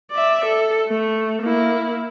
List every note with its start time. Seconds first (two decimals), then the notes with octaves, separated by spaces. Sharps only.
0.11 D5 E5
0.45 A4
0.88 A3
1.42 A#3 E4